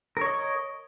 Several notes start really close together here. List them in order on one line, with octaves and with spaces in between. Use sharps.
A#4 C#5 D#5